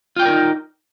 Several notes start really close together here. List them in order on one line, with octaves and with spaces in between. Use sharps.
F4 G5 D5 A#4 D#4